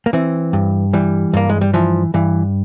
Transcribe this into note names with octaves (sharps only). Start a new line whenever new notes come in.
A#3
E3 C4
G2
E3 G3
G2 A#3
G#3
G3
E3 F3
G2 E3